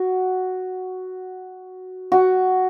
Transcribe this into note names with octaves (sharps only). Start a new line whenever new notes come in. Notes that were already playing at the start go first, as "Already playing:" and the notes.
Already playing: F#4
F#4